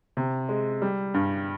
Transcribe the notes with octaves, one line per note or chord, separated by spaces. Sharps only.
C3
G#3
G3
G2